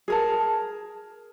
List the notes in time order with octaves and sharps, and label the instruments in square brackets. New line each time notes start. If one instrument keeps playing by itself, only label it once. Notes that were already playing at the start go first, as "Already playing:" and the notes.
[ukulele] G#4 A#4 A5